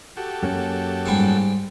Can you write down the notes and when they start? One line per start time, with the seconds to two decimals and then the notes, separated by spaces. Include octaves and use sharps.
0.17 F#4 G4 A4
0.43 F#2 A#3 C#4
1.06 G#2 G3